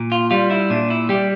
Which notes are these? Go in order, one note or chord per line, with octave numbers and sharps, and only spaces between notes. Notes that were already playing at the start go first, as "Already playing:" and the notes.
Already playing: A#2
F4
G3 F4
E4
A#2 D4
E4
G3 G4